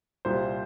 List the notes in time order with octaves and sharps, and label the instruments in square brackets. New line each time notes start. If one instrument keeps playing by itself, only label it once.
[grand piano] C2 A#2 G3 [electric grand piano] C5